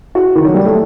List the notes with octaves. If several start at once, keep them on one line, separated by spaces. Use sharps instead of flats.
F#4
D#3
F#3
G3
A3